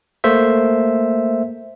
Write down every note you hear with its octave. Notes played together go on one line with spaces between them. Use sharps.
A3 A#3 C5 E5